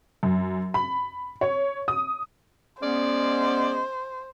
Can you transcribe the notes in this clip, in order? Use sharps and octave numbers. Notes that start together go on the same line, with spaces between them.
F#2
B5
C#5
D#6
G#3 B3 C#4 C5 D5